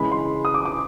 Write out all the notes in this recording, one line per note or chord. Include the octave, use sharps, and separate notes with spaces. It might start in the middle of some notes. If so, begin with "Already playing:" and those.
Already playing: C#3 E3 G#3 B5
C6
D#6
D6
D6